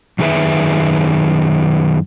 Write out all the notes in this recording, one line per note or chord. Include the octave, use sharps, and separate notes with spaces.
F#2 D#3 G#4 B4 E5